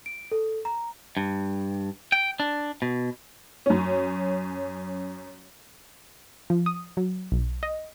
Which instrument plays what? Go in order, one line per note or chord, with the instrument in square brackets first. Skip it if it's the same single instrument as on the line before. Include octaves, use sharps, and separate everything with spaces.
[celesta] D7
A4
A#5
[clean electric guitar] G2
G5
D4
B2
[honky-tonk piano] F#2 C#4
[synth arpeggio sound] F3
D#6
F#3
B1
D#5